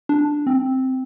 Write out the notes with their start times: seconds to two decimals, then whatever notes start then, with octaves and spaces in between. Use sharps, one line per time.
0.09 D4
0.47 C4